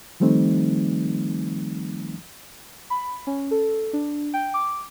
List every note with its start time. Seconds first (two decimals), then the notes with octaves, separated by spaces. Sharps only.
0.20 D#3 F3 G3 A3 C4 D#4
2.90 B5
3.27 C#4
3.51 A4
3.93 D4
4.34 G5
4.54 D6